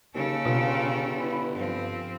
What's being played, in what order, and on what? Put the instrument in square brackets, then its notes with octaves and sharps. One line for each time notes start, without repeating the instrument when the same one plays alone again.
[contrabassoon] D#2 [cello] C#3 A4
[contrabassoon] G1 [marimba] B2 [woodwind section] F4 F5
[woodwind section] E4 B4
[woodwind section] G2 [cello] F3 C4